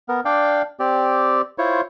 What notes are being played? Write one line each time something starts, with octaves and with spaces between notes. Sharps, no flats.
B3 A#4
D4 D5 F5 G5
C4 G4 D5
E4 F4 C5 C#5